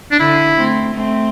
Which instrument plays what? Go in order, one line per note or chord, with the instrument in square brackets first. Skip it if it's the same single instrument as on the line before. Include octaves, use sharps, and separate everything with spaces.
[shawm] D4
[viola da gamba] D3 [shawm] E4
[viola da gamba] A3 C4
A3 C4